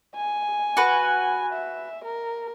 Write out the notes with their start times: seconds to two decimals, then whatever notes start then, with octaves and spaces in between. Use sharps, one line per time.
0.16 G#5
0.77 F#4 B4
1.53 E5
2.04 A#4